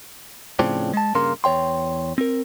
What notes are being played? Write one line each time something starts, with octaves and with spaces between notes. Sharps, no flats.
A2 C#3 F3 C4 D4
G#3 A5
G2 C#3 A#3 A#4 C6
E2 C#5 G5 C6
C4 A#4